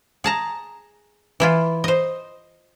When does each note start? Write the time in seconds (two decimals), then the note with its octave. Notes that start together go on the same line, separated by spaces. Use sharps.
0.24 G#4 A5 A#5
1.40 E3 E4 F4
1.84 C5 D#5